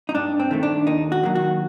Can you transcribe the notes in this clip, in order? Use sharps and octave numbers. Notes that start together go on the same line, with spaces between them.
D#4
G2 D4
C4
D#3 A3
D4
D#2 D#4
F#4
D#3 F#3 A#3
F#4